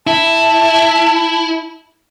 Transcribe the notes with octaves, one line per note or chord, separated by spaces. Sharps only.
E4 A5